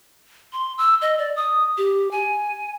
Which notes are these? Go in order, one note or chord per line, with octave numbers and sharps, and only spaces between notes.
C6
E6
D#5
D5
D#6
G4
G#5